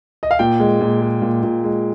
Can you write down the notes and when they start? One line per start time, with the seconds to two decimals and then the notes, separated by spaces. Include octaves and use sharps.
0.23 D#5
0.31 F5
0.39 A#2 G5
0.60 G#3
0.81 A#2
1.01 G#3
1.22 A#2
1.43 A#2
1.64 G#3